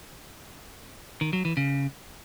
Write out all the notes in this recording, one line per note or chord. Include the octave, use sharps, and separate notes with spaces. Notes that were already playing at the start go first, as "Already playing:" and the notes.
D#3
F#3
E3
C#3